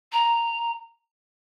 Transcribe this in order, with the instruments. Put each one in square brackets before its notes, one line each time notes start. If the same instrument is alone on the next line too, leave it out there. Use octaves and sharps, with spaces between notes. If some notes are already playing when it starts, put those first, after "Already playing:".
[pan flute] A#5